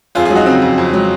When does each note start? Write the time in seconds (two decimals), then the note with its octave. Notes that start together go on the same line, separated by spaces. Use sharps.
0.15 F2 F4 G#4
0.25 F4 G#4
0.30 F#3
0.35 D#4 F#4
0.46 C#3 C4
0.62 F2
0.78 F2
0.93 F#3